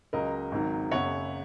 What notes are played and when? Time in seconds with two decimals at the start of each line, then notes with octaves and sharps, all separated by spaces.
0.13 C#2 C#3 F#3 A#4 D#5
0.52 G#1 G#2 D#3 F#3
0.91 F#1 F#2 C#3 C#5 F#5